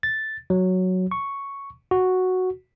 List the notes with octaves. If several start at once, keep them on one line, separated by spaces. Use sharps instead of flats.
A6
F#3
C#6
F#4